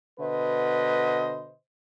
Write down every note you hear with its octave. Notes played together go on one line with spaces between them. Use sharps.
B2 D3 B4 C5 D#5